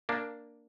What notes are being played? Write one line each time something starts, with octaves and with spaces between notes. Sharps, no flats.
A#3 D4